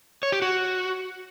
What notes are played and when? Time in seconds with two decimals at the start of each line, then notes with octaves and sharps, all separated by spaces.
0.23 C#5
0.32 G4
0.42 F#4